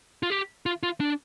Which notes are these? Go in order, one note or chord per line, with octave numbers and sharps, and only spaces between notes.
F4
G4
F4
F4
D4